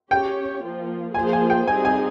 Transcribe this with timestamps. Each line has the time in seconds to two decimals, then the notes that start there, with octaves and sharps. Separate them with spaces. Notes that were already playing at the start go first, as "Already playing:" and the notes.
0.11 C#4 G4 C#5 G5
0.63 F3 A#3 F4
1.14 F3 A#3 F4 G#4 C5 G#5
1.33 G#5
1.50 G5
1.66 G3 C4 D#4 G#4 G#5
1.85 G#5